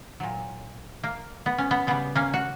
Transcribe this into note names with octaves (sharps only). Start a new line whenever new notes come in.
A#2 F#3
A#3
B3
C#4
B3
C#3 G3 B3
A#3 C#4
F#4